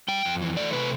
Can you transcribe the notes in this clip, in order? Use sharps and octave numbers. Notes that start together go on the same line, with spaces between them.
G3 G5
F2
E3
A3 D5
C3 B4